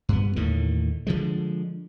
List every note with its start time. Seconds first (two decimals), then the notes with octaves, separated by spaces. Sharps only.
0.09 G2 B3
0.36 D#2 A2 D3 D#3
1.07 D3 E3 F3 G#3